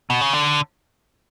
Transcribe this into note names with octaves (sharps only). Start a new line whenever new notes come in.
B2
C#3
D3